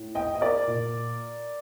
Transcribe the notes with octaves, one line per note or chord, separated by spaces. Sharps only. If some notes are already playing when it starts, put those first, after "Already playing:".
Already playing: A2
D#5 G5
D#5
A#4 D5
A#2